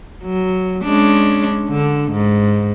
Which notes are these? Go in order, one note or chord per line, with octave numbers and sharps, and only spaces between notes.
F#3
G#3 C#4 D4
D3
G#2